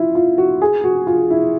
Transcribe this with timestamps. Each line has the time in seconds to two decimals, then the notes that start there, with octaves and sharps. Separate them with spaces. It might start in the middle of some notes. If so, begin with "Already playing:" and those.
Already playing: E4 F4
0.15 F4
0.38 F#4
0.62 G#4
0.84 F#4
1.07 F4
1.30 E4